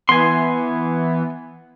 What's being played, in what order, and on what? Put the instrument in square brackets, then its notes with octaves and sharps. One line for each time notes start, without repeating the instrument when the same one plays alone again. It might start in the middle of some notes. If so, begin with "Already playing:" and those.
[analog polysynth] E3 B3 [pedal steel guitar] G#5 C6